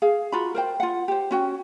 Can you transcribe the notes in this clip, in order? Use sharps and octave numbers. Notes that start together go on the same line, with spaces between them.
G#4 F5
F4 F#4 A#5 B5
A#4 C5 G5
F4 F#5
G4 C5
C#4 F#4 G5